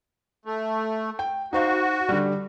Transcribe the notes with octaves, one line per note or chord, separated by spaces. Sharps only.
A3
G5
D#4 F#4 C5 F5
D3 G3